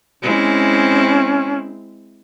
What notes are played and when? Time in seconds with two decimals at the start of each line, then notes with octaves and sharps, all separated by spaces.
0.23 G#3 C4 C#4 E4